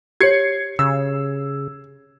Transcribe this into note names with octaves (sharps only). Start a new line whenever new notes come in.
G4 C#5 G#6 C7 C#7
C#3 E6